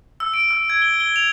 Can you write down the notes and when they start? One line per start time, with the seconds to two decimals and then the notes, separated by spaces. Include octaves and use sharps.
0.20 E6
0.34 D7
0.51 E6
0.70 G#6
0.82 G7
1.00 G7
1.16 F7